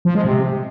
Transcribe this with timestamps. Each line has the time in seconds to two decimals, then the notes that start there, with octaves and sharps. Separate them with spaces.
0.05 F3
0.15 G#3
0.25 C3